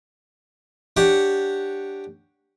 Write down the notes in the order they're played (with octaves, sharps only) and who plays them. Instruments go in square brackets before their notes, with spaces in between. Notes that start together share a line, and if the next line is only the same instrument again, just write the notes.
[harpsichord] D4 G4 C#5 F#5